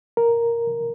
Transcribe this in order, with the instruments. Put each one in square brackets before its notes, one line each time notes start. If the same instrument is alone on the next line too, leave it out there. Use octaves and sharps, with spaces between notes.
[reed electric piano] A#4